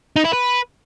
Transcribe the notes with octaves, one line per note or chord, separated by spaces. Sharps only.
D#4
E4
B4